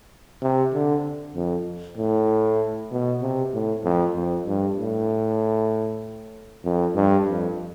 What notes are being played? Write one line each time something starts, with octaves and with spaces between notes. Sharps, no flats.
C3
D3
F2
A2
B2
C3
A2
F2
F2
G2
A2
F2
G2
F2